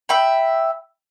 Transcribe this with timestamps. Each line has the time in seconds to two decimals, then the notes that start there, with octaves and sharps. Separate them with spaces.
0.09 E5 G5 B5